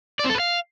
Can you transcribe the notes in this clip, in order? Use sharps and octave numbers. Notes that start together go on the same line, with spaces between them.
D5
C4
A4
B4
F5